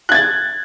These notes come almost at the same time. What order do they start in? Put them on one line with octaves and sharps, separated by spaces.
F#6 G#6 A6